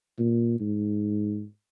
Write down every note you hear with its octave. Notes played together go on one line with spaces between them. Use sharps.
A#2
G#2